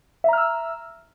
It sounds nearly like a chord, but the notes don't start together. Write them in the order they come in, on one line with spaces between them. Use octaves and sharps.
E5 A#5 F6 E6